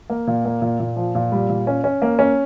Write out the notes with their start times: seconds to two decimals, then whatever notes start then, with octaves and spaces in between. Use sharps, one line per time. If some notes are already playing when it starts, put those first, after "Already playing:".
0.10 A#3
0.27 A#2
0.45 A#3
0.62 A#2
0.80 A#2
0.96 F3
1.15 A#2
1.32 G3
1.49 A#2
1.67 C#4
1.84 C#4
2.02 A#3
2.19 C#4